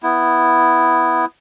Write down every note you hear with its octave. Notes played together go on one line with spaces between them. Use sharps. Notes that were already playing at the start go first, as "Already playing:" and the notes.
B3 E4